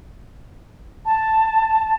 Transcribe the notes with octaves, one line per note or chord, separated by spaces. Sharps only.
A5